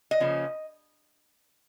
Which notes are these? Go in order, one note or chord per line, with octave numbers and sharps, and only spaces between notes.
D#5
C#3 F3 A#3 C#4